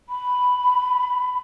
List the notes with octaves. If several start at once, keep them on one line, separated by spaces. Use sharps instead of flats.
B5